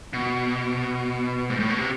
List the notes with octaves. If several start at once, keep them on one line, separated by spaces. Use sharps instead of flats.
B2
G#2
A2
B2
C3